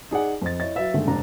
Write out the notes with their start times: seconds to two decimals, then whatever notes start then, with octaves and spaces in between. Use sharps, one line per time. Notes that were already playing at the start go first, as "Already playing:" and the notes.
0.11 D#4 G#4 D5 F#5
0.42 F2 C5 D#5 A6
0.60 E4 C#5 D#5 A6
0.75 F#3 B4 E5 F5
0.94 G2 D3 D#3 G#3 A3
1.08 F1 G2 D4 A#5